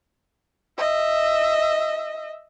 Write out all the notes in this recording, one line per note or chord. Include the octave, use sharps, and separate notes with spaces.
D#5 E5